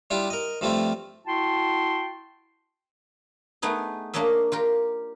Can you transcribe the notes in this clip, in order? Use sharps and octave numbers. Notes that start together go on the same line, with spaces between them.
G3 D4 E4 F4 G4
A#4 D#5
G2 F3 G3 A3 C4 F4
E4 F#4 G5 A5 C6
A3 B3 D#4 G#4
A#3 D4 C#5 D#5 E5
F4 G4 A#4